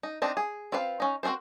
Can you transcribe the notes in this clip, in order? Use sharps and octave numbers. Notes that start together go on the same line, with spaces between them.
D#4
C4 D4 D#4
G#4
C4 F4 B4 F5
C#4 D#4
C4 F#4 A4 A#4 C5